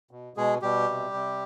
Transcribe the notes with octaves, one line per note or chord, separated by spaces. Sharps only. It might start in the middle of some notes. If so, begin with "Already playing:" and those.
B2
B2 G#3 G#4
B2 G3 G4
C3
C3